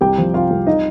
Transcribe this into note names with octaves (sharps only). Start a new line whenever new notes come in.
C2 G4 G5
F3
C3 F4 F5
C2
D#4 D#5